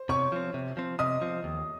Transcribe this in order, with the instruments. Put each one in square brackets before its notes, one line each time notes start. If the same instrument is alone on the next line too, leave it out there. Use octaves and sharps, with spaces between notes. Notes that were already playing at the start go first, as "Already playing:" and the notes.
Already playing: [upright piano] C5
[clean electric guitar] C3 [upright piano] C#5 C#6
[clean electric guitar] F3 C4
C3
F3 C4
[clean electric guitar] C3 [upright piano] D#5 D#6
[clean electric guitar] F3 C4
D#2